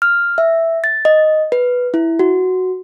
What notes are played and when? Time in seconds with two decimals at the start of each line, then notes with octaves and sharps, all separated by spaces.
0.02 F6
0.38 E5
0.84 A6
1.05 D#5
1.52 B4
1.94 E4
2.19 F#4